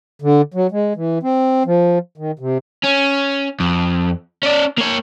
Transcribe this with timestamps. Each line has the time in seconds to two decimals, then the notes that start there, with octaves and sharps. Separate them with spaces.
0.22 D3
0.54 F#3
0.71 G#3
0.96 E3
1.23 C4
1.66 F3
2.17 D#3
2.39 C3
2.84 C#4
3.60 F2
4.43 C#4 D5
4.78 A#3 C#5